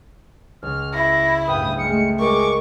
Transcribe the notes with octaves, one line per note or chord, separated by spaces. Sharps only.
C#2 F6
E4 A#6
G1 A2 B4 F5 G5 D#6
G#3 A3 F6 C#7
G#3 A#4 C#6 D6